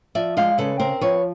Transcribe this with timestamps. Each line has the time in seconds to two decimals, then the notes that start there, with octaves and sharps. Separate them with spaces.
0.15 F3 D5 E5
0.37 G#3 D#5 F5
0.58 C#3 A4 B4
0.80 C4 A#4 C5
1.01 F3 B4 C#5